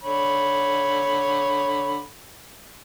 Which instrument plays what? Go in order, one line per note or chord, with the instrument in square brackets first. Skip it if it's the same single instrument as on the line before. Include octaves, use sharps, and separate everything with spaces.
[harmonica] D3 C#5 B5